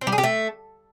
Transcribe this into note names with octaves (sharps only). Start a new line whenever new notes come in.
C4
G3
G#4
G4
A3